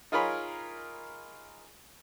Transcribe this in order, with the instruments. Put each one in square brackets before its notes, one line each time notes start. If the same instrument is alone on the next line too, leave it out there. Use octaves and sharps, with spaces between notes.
[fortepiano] D#4 F4 G#4 A#4 C#5 B5